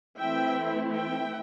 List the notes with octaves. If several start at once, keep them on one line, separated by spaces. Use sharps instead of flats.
E3 A3 C4 E4 E5 G5
E5 G5